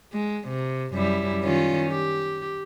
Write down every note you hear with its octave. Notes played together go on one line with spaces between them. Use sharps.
G#3
C3
F#2 G3 E4
D#3 C#4 F4
G4